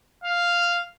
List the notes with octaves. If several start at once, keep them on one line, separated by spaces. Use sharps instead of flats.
F5